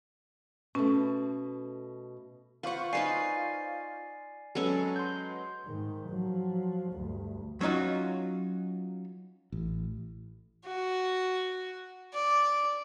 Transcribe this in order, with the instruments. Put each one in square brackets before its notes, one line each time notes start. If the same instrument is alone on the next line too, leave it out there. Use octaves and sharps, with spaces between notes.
[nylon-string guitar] B2 A3 [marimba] C#4
[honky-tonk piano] F4 C5 C#6 [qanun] B4 F#5
[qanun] D#4 B4 F5 [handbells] D5 G#5 C7
[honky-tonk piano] F#3 G#3 B4 [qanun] C#4 A4
[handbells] C6 G6
[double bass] G#2 D#3
F3 F#3
D2 G2
[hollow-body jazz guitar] F#3 C#4 D#4 F4 F#4
[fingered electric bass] A1
[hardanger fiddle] F#4
D5